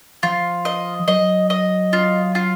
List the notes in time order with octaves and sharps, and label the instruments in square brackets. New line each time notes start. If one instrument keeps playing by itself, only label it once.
[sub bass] F3 [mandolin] F4
[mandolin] D#5
[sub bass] F#3 [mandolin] D#5
[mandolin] D#5
F4
F4